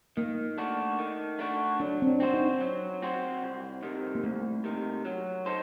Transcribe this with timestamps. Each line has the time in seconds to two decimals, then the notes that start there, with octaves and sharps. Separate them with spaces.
0.17 D#3 A#3
0.58 A3 D4 F#4
0.99 D#3
1.39 A3 D4 F#4
1.80 F#3 D4
2.02 C4
2.07 D4
2.20 C4 F#4 C5
2.30 D4
2.34 D#4
2.61 F#3
3.02 C4 F#4 C5
3.42 C2
3.83 C3 D#3
4.15 A#3
4.24 C2 A3
4.64 C3 D#3
5.05 F#3
5.46 D#4 A4 C5